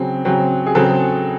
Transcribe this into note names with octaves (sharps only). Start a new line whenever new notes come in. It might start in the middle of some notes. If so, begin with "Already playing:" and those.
Already playing: C#3 F#3 C4
C#3 F#3 C4
G#4
C#3 F#3 C4 A4